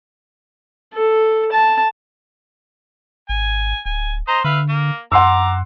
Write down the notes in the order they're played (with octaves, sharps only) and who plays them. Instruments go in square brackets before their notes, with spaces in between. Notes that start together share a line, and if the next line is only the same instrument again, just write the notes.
[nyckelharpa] A4
A5
[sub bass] G#1 [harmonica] G#5
[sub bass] D1 [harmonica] G#5
[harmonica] C5 D#5 A#5
[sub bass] D3 [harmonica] B4 E5 F5
[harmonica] A#3
[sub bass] F#2 [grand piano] F#5 C6 E6 [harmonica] A#5 D6